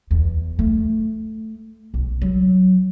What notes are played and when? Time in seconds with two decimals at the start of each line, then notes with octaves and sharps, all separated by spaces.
0.11 E2
0.59 A3
1.94 B1
2.22 F#3